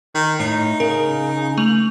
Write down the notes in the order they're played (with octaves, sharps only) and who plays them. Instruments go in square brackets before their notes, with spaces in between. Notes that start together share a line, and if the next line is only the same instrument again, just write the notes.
[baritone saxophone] D#3
[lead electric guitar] A2 [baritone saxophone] D#4
[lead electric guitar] C#3 [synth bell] A#4
[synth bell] A3 F7 F#7